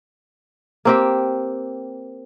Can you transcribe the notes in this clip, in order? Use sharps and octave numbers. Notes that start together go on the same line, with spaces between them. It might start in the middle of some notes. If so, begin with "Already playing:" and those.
A#3 C4 G4